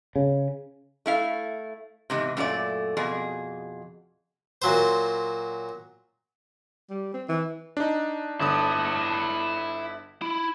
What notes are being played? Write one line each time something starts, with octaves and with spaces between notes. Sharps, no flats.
C#3
A3 E4 F5
E2 G#2 C3
F#2 A#2 A3 D5
F2 B2 G#4
A#2 F#3 C5
G3
C4
E3
D4 D#4
G1 D3 E4 A5 D#6
E4